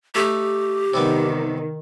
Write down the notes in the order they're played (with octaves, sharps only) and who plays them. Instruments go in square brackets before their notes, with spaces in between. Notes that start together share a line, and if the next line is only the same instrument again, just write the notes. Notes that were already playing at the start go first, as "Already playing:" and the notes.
[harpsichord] A3 D#4 [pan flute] G4
[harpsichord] C3 G3 B3 [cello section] D#3